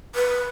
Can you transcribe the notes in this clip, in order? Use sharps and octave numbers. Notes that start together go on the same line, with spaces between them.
B4